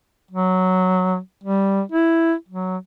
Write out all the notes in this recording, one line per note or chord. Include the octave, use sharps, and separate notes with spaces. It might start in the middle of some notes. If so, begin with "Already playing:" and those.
F#3
G3
E4
F#3